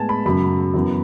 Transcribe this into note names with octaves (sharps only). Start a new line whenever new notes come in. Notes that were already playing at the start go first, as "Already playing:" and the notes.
Already playing: A2 G#3 B3 G#5 A5
B5
F#2 C#3 F#3 B5
F#2 E3 B3